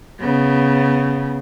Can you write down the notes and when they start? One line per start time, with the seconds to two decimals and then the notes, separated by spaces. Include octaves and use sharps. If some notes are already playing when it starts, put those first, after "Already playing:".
0.20 C#3 B3